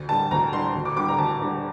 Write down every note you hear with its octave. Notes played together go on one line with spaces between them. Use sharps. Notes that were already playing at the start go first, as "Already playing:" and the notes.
Already playing: D2
D3 G3 A5
D2 A#5
D3 G3 C6
D2
D6
D3 G3 D6
A#5
D2 A5
D3 G3